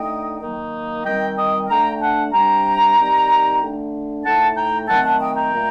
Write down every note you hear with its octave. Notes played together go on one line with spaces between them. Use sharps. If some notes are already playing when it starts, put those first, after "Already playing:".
Already playing: D3 A3 D#4 D#5 G5
D#3 F#3 A#3 D#4
D#3 G3 C4 D#5 G5
D#5 G5
D3 A3 D4 G5 A#5
F#5 A5
C3 G3 D4 G5 A#5
D#3 G3 C4 D#4
D3 A3 D4
A2 A3 D#4 F#5 A5
G5 A#5
D#3 F#3 A3 C4 D#4 F#5 A5
F#5 A5
D#5 G5
G5 A#5
A#2 A3